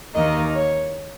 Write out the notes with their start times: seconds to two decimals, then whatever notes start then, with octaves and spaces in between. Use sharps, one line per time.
0.15 D#2 D#3 A#3 D#4 D#5
0.55 C#5